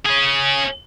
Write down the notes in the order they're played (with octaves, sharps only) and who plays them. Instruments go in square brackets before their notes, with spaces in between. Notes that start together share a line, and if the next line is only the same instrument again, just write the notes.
[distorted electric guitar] C#4 G#4